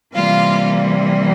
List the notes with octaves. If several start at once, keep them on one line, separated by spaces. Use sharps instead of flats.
C3 E3 G3 A#3 F4 F5